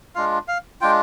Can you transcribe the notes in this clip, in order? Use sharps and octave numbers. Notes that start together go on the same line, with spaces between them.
G#3 D4 F4 F5
F5
G#3 D4 F4 G5